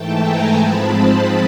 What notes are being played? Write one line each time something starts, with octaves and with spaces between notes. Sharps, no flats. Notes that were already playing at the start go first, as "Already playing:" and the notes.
Already playing: G#2 E3 A3 G5 A5
G#5 A#5
G#2 F3 G#3 C4 A5 B5
A5 B5